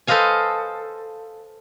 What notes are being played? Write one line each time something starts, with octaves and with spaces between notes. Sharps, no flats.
A4 B4 C5 D#5 F5 G#5